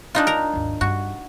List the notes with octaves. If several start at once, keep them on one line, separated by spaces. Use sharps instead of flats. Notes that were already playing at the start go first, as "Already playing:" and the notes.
D4 D#4 F4
A#4 A#5
G#1 D#2
G2 F#4